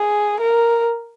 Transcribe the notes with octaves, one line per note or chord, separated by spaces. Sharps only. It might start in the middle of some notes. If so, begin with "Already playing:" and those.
Already playing: G#4
A#4